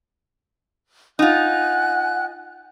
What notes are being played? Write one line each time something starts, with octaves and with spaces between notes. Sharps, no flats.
D#4 F4 F#5 G#5 F#6